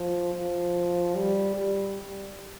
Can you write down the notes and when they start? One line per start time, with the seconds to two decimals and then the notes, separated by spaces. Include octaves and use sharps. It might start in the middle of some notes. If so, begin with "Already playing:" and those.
Already playing: F3
0.34 F3
1.15 G3
1.55 G3